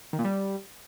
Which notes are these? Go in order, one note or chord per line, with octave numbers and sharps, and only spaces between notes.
D#3
A#2
G3